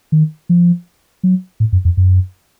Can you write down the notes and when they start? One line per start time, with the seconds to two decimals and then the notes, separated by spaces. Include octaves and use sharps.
0.12 D#3
0.49 F3
1.23 F#3
1.60 A2
1.73 F#2
1.85 F2
1.97 F#2